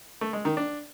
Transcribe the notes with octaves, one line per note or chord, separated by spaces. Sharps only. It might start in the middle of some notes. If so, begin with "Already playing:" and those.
A3
G#3
D#3
D4